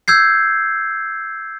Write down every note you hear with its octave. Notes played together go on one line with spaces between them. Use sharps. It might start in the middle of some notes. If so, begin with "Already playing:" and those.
E6 G6 G#6 C7